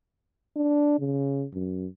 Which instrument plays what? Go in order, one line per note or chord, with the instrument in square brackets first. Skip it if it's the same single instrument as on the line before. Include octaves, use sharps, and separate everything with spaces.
[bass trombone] D4
C#3
F#2